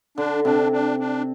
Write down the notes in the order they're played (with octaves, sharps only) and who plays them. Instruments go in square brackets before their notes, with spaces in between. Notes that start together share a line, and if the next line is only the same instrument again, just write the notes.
[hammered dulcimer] D3 [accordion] D4
[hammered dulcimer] C3 [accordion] D4
[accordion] D4
D4